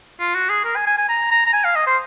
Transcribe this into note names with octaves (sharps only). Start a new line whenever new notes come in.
F4
F#4
G#4
A#4
G#5
G#5
G#5
A#5
A#5
A#5
G#5
F5
D#5
C5